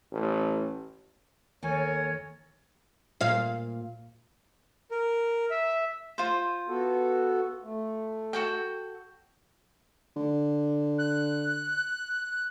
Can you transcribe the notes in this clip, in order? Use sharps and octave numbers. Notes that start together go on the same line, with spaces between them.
A1
D#2 A4 A#4 C#5 G#5
A#2 F5
A#4
E5
F4 C5
B3 F#4 A4
A3
F#4 A4 G5
D3
F#6